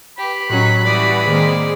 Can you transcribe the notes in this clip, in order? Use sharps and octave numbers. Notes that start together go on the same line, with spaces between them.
G4 B4 B5
A2 F#3 C#4 D#4 F#6
E3 G3 F#4 D5 D#6
D#3 G#3 A#3 C4